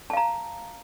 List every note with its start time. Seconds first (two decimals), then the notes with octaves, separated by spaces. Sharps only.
0.10 A5
0.13 F5
0.17 A#5